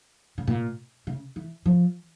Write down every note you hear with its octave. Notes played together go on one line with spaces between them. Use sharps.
C#3
A#2
C#3
E3
F3